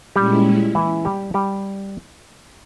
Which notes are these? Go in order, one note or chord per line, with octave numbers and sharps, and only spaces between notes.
A#2 G3 G#3 C#4 E4 G4
E3 E4
G3 G4
G3 G4